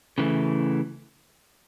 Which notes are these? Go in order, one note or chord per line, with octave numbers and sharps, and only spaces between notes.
C#3 E3 A3